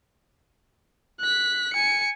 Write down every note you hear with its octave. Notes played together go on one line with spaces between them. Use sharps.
F#6 B6
G#5 C#7